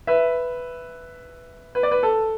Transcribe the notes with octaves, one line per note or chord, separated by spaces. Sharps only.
B4 E5
B4
D5
B4
A4